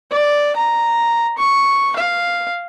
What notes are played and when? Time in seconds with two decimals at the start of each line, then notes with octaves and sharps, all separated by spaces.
0.11 D5
0.56 A#5
1.38 C#6
1.96 F5